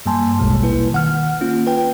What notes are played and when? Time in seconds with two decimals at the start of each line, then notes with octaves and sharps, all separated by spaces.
0.06 G2 G3 A#3 G#5 A5 C6
0.39 A#1 D#2 B2 G3 G#3
0.63 A#3 E4 B4
0.92 D#3 F#5 F6
1.41 A#3 C#4 F4
1.67 B4 G5